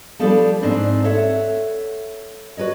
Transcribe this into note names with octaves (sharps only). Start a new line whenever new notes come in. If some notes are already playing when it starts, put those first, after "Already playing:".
F3 G3 B3 D4 G4 A4
G#2 C4 D4 D#4
A4 C#5 E5 F#5
F#4 B4 C#5 D#5